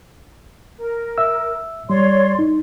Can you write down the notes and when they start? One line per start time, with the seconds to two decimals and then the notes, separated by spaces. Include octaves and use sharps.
0.78 A#4
1.18 E5 E6
1.90 G3 C#5 D5 C6
2.39 D#4